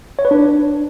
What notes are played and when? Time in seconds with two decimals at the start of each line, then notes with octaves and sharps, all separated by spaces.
0.19 C#5
0.25 B4
0.31 D4